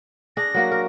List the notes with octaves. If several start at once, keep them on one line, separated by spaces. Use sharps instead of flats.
D4 G#4 A#6
F#3 A#3 F#4
A#4